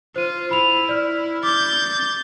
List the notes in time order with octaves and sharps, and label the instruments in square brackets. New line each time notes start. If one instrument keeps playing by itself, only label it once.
[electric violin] F4 [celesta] C5 D#7
[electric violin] E4 [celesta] B5 F7
[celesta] D5 F6
[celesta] D6 [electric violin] G6 A6